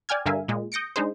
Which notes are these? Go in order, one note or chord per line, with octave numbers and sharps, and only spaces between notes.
D5 G5 G#5 F6 G#6
G2 D3 A#4 E5 F5 G#5
A#2 G#3
D#6 G6 A#6 C#7 D7
G#3 D4 D#4 G#4 C5